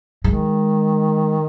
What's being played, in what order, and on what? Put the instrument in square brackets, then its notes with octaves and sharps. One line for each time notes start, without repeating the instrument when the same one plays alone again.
[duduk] D#3 [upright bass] G#3